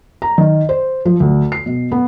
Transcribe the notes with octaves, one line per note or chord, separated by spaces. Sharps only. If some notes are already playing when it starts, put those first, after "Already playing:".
A#5
D#3
C5
F3
D2
C7
B2
B3